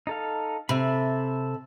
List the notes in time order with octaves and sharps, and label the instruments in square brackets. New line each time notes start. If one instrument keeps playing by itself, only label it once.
[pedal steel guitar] D#4 A4 F5
[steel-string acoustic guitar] C3 [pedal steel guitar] A4 E5 B5